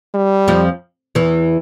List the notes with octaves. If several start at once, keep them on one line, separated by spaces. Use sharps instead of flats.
G3
F2 F3
E2 E3